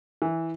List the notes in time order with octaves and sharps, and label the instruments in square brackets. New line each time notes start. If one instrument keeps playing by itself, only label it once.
[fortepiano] E3